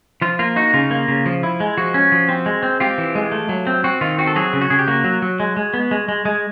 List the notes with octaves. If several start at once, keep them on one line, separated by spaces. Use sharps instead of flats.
F3 F4
A#3 F4
D#4 F#4
C#3 F4
A#3
C#3
F3
E4
G#3
F3 F#4
C#4
F3
C4
G#3
C4
C4 F4 G4
E3
G#3
A3
F#3
C4
C4 F#4
D#3 F4
C4 F#4
A4
F#3 F#4 G#4
C#3
F#4
C#3 G#4
G4
A#3 F#4
F#3
F#3
G#3
G#3
B3
G#3
G#3
G#3